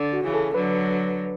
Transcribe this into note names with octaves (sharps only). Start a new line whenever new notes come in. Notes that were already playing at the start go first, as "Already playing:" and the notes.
Already playing: D3
F#4
C#3 E3
A4
D3 F#3 B4